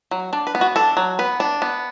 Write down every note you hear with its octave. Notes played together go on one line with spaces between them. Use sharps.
F#3
D4 D5
B4
B3
F#4
D4 A4
F#3
B3 B4
D4
B3